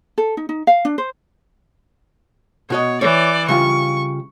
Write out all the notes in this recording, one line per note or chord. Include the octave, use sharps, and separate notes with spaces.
A4
D#4
D#4
F5
D4
C5
B2 F#4 C#5 D#5
E3 C#5 D5
C#3 G3 F4 C#6